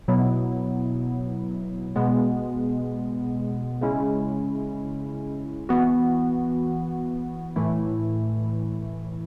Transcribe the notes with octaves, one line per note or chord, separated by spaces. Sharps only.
B2 F#3 B3 E4
B2 G#3 B3
C#3 G#3 C#4 E4
E3 B3 F#4
A2 E3 A3 E4